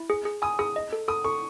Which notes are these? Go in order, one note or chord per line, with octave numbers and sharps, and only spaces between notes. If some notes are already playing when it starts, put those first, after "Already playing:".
Already playing: E4
G#4
G#4
G#5 D#6
G#4 D#6
D#5
A4
A4 D#6
A4 C#6